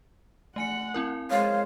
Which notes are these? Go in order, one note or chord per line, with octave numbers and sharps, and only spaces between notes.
A3 F#5 G#5 C#7
C4 E4 A#4
G#3 C5 C#5 F5